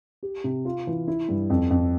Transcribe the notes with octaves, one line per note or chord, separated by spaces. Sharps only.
G4
C3
F4
E3
E4
G2
F2
F2